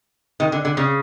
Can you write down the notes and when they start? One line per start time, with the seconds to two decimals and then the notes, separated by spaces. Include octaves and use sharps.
0.40 D#3
0.52 D3
0.65 D3
0.77 C#3